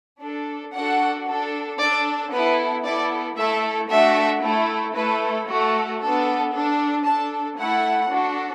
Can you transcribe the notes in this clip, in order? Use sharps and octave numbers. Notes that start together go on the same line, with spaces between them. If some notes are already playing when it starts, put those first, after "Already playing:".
D4 A4
D4 F#4 A4 F#5
D4 A4
D4 A4 D5
B3 E4 A4 B4
B3 E4 A4 D5
A3 E4 A4 E5
A3 D4 F#4 A4 E5
A3 E4 A4
A3 E4 A4 B4
A3 F#4 A4
B3 D4 A4
D4 A4
D4 A4 A5
A3 E4 A4 F#5
D4 F#4 A4